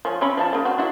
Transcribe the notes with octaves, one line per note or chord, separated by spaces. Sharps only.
F3 C#5 G#5
C4 C#4 B5
F3 D5 A5
C#3 A#3
C4 F#4
D4 E4 F#4